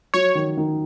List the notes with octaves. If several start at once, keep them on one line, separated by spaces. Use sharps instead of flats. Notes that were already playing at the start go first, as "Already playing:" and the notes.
F#3 C#5
D#3
D#3